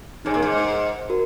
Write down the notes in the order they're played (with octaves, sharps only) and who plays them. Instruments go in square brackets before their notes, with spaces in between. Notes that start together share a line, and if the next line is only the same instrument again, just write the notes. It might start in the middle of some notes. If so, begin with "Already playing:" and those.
[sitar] G#2 [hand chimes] D#4 G#4 C#5 G#5
[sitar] A#2
G#2
[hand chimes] F#4 A#4